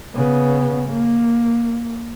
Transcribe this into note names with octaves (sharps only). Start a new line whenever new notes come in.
C#3 B3
A#3